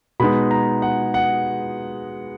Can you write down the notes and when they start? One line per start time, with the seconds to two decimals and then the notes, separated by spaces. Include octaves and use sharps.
0.20 B2 G#3 B3 D#4 B5
0.51 A#5
0.82 F#5
1.14 F#5